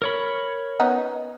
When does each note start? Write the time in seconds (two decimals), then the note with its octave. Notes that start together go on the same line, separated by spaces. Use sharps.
0.02 A#4 C#5 B5
0.80 B3 C#4 D#4